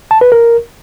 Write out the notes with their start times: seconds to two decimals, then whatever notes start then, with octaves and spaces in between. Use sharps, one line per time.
0.11 A5
0.21 B4
0.32 A#4